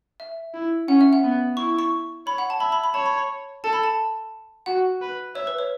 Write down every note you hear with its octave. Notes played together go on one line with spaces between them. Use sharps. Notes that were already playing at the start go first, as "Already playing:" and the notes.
E5
E4
C#4 F#5
E5
F#5
B3
E4 C#6
C#6
C#5 B5
F#5
A5
E5 B5
B5
B5
C#5 A5
B5
A4 A5
B5
A5
F#4 F#5
B4
C#5 E5
B4
C#5